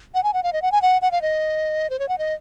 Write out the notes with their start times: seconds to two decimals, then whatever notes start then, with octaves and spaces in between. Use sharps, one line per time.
0.14 F#5
0.23 G#5
0.34 F#5
0.43 F5
0.53 D#5
0.62 F#5
0.72 G#5
0.82 F#5
1.02 F#5
1.11 F5
1.22 D#5
1.90 C5
1.99 C#5
2.09 F#5
2.18 D#5